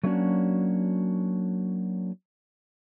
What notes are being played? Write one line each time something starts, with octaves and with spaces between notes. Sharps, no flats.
F#3 A3 A#3 C#4 D4 F#4